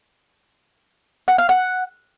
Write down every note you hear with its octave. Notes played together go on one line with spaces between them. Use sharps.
F#5
F5
F#5